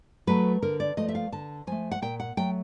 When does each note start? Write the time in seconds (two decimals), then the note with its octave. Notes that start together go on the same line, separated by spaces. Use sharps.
0.27 F#3 A3 B4
0.62 D3 A#4
0.80 D5
0.97 F3 A3 D#5
1.08 E5
1.15 F5
1.32 D3 A5
1.67 F3 A3 G#5
1.91 F#5
2.02 A#2 G5
2.20 F#5
2.37 F#3 A3 G5